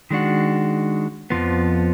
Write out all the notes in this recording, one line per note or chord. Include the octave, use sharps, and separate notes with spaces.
D#3 G#3 D4 F#4
F2 F3 B3